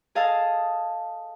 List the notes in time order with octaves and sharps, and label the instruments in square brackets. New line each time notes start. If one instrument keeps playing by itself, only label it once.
[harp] G#4 A4 D#5 F5 A5